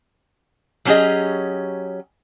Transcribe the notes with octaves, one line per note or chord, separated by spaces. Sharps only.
F#3 G3 C#4 G4 G#4 D#5